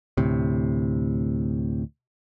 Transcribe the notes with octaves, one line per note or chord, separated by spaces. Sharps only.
D2 A2 C3